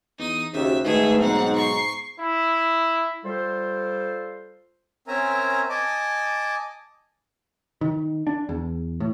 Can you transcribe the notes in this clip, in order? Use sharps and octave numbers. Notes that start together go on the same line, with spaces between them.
E2 D#4 D#6
D#2 C#3 F#4 G4 C5 E5
G#2 D#3 A3 G#4 B4 E5
B1 C4 F#5 A#5
C#6 C7
E4
G3 F4 A4 C5
C4 C#4 A#4 E5 G#5 A#5
D#5 G#5 A5 D6
D#3
D4
E2
A2